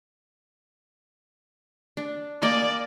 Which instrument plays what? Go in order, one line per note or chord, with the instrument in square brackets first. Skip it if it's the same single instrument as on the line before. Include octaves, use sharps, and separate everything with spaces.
[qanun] D4
[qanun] A#3 D#5 G#5 [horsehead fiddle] D5